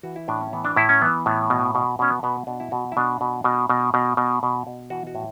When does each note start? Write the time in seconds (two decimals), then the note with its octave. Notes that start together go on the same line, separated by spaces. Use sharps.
0.03 E3 F#4
0.16 E4
0.28 A2 D4
0.41 C#4
0.53 E3 B3
0.65 D4
0.76 A2 E4
0.89 C#4
1.02 E3 B3
1.26 A2
1.50 B2
1.75 B2
1.99 B2 C#4
2.10 B3
2.23 B2 B3
2.47 B2 D4
2.60 E4
2.71 B2 F#4
2.92 E4
2.97 B2 D4
3.21 B2
3.44 B2
3.70 B2
3.94 B2
4.17 B2
4.43 B2
4.67 B2
4.90 E3 F#4
5.07 F#4
5.15 A2